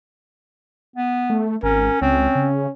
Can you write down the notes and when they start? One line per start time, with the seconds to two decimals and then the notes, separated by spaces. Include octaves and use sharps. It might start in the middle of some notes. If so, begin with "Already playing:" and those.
0.96 B3
1.30 A3
1.63 G#1 C#4 A#4
2.02 C#2 C4 C#4
2.35 C#3